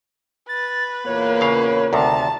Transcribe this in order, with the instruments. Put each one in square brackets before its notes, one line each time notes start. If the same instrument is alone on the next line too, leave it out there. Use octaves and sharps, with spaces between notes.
[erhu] B4 [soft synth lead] A6
[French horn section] E2 A#2 A#3 [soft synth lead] C#5
[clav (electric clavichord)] C#3 F5
[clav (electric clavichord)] D2 C3 D#3 [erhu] A5 [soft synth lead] A#5